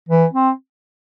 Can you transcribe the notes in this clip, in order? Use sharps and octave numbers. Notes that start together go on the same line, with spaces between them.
E3
C4